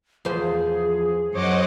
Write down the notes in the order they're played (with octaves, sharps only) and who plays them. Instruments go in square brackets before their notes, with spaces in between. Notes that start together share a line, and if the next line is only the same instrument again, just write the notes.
[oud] E2 F3 C5 [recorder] G#4
[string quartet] F#2 C#5 D6 [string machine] C5 D#5 F#5